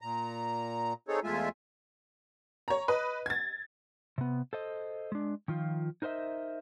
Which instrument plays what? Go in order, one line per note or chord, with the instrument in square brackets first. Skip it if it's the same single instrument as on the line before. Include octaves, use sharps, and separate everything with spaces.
[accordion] A#2 A#5
C4 D#4 G#4 A4 C#5
E2 G#3 A3 F4 E5 G#5
[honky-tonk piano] C#5 A#5
B4 D#5
G#6 A6
[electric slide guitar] C3 B3
A4 C5 D#5
G#3 D4
D#3 F3 F4
D#4 A#4 C5 D#5 E5